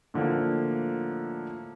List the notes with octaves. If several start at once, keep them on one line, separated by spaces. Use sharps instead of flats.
A2 D3 F3 A#3